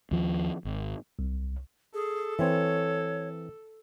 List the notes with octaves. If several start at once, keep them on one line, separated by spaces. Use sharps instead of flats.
D#2 F3
G#1
C2
G#4 A4
E3 C4 C#5